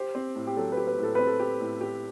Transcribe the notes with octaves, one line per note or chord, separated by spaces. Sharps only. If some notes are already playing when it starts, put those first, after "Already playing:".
Already playing: G4 C5
C4
A2
G4
F#3 A4
G4 B4
B4
A2
A4
C4 B4
A4
G4
A2
G4